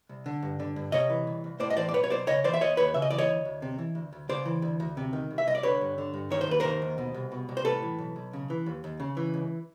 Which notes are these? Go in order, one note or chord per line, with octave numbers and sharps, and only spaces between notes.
C2
D3
G2
D3
G2
C3 C#5 D#5
E3
C2
C2
A2 C5 D5
D#5
E3 C5 D5
D5
B1 B4 C#5
C#5
B1 C5 D5
C#3 C#5 D#5
E3 C5 D5
E5
D#2 C#5 D#5
D#2 B4 C#5
C#3 E5
D#5
E3 D5
C#5 D#5
D2
D2
C3
E3
D2
D2
C#3 C5 D5
E3
D2
D2
C3
D#3
C2
E5
C2 D#5
D5
D3 B4 C#5
G2
D3
G2
D#3 C#5
C5
D#2 B4
D#3 A#4 C5
D#2
B2
C2
B2
C2
C5
A2 A4 B4
E3
B1
B1
C#3
E3
D#2
D#2
C#3
E3
C#2